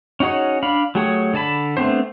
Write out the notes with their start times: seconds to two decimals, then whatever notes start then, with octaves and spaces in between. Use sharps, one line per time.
0.20 C#4 D#4 F#4 G#4 C#5
0.63 D4 F5 B5
0.95 F#3 A3 G4 G#4 C#5
1.34 D3 D5 A5 B5
1.77 A3 B3 C4 D4 C5